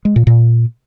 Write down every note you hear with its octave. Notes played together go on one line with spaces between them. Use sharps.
G#3
A#2
A#2